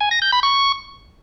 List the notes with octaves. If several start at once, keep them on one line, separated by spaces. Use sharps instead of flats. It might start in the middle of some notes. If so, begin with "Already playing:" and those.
G#5
A#6
G6
B5
C#6